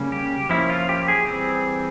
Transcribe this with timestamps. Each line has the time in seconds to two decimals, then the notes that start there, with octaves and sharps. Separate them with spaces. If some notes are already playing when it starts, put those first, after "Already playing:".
Already playing: C#3 G3 A#3 C#4
0.12 G4
0.50 F3 A#3 C#4 E4
0.70 F4
0.89 G4
1.08 G#4
1.26 E3 G3 C4